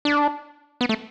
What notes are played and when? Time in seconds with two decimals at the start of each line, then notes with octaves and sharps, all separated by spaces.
0.05 D4
0.81 B3
0.89 A3